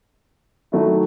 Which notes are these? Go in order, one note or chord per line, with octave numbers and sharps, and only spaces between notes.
D#3 F#3 A3 E4